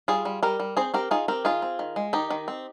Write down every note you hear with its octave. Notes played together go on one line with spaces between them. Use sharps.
G3 F4 G#4
G3
G3 G4 A#4
G3
C4 G#4 C5
C4 G4 A#4
D#4 F4 G#4
C4 G4 A#4
D#3 F4 G#4
C4
D#3
G#3
D#3 D#4 G4
D#3
C4